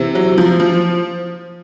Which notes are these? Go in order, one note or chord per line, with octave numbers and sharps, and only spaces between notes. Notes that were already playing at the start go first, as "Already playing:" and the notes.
Already playing: C3 E3
F#3
F3
F3